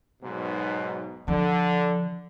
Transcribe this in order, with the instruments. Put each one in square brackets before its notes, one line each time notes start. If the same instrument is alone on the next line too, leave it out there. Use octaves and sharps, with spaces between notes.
[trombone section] B1 G#2 B2
[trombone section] D3 [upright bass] F3